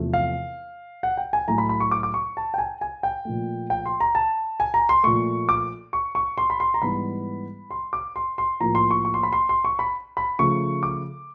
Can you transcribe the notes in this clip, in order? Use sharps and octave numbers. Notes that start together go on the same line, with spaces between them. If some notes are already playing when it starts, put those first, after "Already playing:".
Already playing: E2 C3 F3 A3
F5
F#5
G5
G#5
A2 F#3 A3 A#5
B5
B5
C#6
D6
D6
C#6
A5
G5
G#5
G#5
G5
A#2 F3 A3
G5
C6
A#5
A5
G#5
A#5
C6
A#2 F3 A3 C#6
D6
C#6
C#6
C6
B5
C6
A#5
G#2 E3 G3 B3 B5
C6
D6
C6
C6
A2 F3 A#3 A#5
C6
C#6
C#6
C6
B5
C6
C6
C#6
B5
B5
C#3 F3 A3 C#6
D6